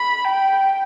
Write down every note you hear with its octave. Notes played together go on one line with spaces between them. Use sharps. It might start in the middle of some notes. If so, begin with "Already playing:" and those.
Already playing: B5
G5